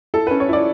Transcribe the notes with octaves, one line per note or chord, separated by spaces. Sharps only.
E4 A4
C#4 B4
C#5
E4 D5